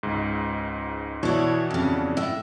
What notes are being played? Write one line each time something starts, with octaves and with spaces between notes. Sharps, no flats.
C#2 G#2
B2 E3 D4 E4 C#5
F2 C#3
A2 E5